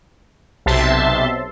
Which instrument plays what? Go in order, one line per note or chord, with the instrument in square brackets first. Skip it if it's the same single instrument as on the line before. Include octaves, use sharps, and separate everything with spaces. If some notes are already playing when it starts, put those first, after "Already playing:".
[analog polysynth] B1 C3 E5 A5 C6